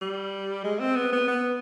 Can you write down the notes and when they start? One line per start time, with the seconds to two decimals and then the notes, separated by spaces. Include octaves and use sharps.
0.01 G3
0.64 G#3
0.80 C4
0.96 B3
1.12 B3
1.28 B3